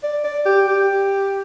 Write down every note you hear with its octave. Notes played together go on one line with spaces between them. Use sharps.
D5
D5
G4
G4